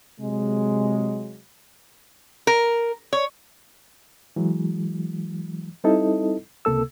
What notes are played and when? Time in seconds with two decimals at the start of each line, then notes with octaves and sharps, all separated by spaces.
0.20 C3 F#3 G#3
2.47 A#4
3.13 C#5
4.36 E3 F#3 G#3
5.84 G3 C4 D#4 E4 A4 D#5
6.65 C#2 C3 A#3 A4 E6